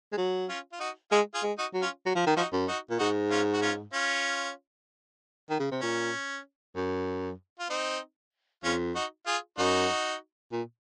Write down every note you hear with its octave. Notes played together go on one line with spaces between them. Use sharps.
G#3
F#3
C#4 F4
F4
D#4 F#4
G#3 F4 G#4
F4 G#4
G#3
D#4 F#4
F#3
C#4 F4
F#3
F3
D#3
F3 D#4 F#4
F#2
D#4 F#4
A#2
G#2 D#4 F#4
C#4 F4
F#4
C#4 F4
C#4 F4
D#3
C#3
C3
A#2 C#4
F#2
F4
C4 D#4
F2 C#4 F4
D#4 F#4
F4 G#4
F#2 D#4 F#4
A#2